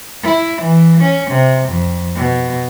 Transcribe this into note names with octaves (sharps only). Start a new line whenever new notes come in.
E4
E3
C#4
C3
F2
B2